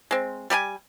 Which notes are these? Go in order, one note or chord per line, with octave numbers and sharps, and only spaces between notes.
G#3 C4
G3 G4 A4 G#5